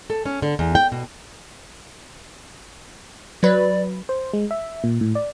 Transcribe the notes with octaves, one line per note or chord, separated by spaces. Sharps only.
A4
C#4
D3
E2
G5
B2
F#3 B4 D5
C5
G#3
E5
A#2
A2
D5